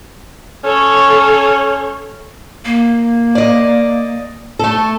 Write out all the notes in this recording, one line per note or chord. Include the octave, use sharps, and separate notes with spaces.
C#4 A4 C#5
A#3
D5 D#5
A3 A4